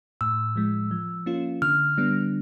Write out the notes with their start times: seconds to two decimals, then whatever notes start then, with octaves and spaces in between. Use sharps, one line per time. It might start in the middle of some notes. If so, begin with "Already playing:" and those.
0.21 A2 E6
0.56 F3 G#3
0.91 F3
1.26 A#3 C#4 F4
1.62 D3 F6
1.97 G3 B3 D4